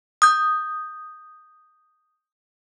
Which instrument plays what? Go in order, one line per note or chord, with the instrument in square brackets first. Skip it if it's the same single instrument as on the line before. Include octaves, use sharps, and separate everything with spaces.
[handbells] D#6 G6